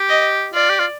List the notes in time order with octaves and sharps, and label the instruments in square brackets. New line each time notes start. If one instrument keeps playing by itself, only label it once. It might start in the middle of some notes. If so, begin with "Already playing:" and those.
Already playing: [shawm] G4
[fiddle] D#5
[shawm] F4 [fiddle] D5
[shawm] G4
F4